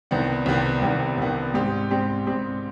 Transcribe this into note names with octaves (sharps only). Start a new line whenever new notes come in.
C2 C3 D#3 B3 D4
C2 C3 D#3 B3 D4
C2 C3 D#3 B3 D4
C2 C3 D#3 B3 D4
G#2 G3 C4 G4
G#2 G3 C4 G4
G#2 G3 C4 G4